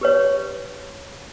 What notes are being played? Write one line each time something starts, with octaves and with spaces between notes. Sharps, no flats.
G4 B4 C#5